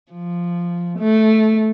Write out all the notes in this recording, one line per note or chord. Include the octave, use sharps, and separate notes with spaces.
F3
A3